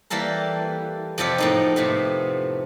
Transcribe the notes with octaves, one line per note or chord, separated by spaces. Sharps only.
E3 G3 A#3 A4 A#4
F2 C3 F3 G4 A4 F#5
A2 A#3 D#4
A2 C3 B3